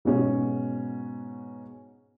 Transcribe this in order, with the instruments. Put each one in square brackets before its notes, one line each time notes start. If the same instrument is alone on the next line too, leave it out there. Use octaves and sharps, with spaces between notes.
[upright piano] G#2 B2 C#4 F#4